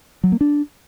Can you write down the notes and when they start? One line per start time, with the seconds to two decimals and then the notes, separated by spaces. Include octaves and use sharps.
0.24 F#3
0.32 A#3
0.41 D4